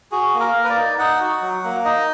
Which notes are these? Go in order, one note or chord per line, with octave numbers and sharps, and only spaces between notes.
F#4 G#4
A#3
A#4
A#3
B4
D5
D#4
D#4 F#5
F#4
F#3
A#3
D#4 D#5